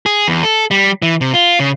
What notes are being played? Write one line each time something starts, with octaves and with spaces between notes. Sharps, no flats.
G#4
E2
A4
G3
E3
C3
F4
C#3